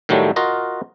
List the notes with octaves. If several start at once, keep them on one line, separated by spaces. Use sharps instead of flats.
A2 D#3 F#3 G3 A3
F4 F#4 A#4 D#5 F5